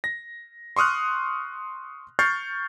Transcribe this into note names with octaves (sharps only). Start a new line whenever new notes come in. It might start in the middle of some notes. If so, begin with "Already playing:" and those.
A#6
C6 C#6 D#6 F6 F#6
C#6 F6 G6 A6 C7